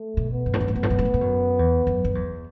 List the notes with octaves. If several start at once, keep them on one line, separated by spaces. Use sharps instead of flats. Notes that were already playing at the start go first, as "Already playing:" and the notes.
Already playing: A3
B2
B3
F#2
A2
F#2
A2
F#2 B3
A2
F#2
A2
F#2
A2
F#2
E2
F#2
F#2
E2